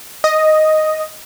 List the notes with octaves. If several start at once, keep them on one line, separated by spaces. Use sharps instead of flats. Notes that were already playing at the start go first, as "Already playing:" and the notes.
D#5